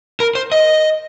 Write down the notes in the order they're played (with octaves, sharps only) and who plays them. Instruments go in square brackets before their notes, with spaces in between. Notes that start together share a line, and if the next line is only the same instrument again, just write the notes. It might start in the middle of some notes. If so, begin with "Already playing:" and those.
[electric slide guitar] A#4
C5
D#5